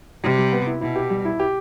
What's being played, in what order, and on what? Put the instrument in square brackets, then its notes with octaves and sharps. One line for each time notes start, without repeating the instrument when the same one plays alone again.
[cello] C3 [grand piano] G3
[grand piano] G3
B3
E4
[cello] B2 [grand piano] E4
[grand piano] G4
G3
E4
G4